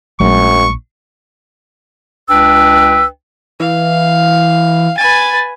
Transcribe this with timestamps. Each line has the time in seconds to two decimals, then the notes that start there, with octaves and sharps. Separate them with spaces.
0.20 A#1 F#2 F#3 G#3 A3 C#6
2.29 C#2 D4 B4 G5 E6
3.60 E3 F5
4.98 B4 G#5 A6